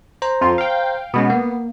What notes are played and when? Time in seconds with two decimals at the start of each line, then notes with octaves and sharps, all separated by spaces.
0.22 C5 A#5
0.41 F2 F4
0.58 F5 G5
1.14 B2 G#3 B3 C#4
1.30 A#3